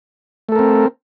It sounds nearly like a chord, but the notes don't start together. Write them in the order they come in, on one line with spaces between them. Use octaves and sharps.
A3 A4 A#4 C4